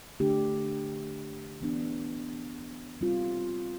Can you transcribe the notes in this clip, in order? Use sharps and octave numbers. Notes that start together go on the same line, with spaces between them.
D3 A3 D4 G4
E3 B3 D4
G3 C4 F4